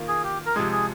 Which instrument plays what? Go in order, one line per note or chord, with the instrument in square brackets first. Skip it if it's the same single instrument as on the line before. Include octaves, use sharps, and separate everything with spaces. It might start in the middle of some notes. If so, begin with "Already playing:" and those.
Already playing: [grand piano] D#3 A#3 F4
[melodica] G#4
G4
A#4
[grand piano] C3 F3 G#3 [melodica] G#4
[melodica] G#4